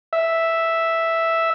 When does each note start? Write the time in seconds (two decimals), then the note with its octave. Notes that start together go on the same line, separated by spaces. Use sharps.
0.13 E5